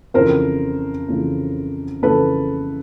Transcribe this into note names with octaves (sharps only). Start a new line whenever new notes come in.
F2 C#3 E3 A#4 C5
F2 C#3 E3
F2 C#3 E3 A4 B4